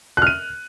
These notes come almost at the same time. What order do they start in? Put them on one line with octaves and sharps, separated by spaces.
F#6 F6 D#7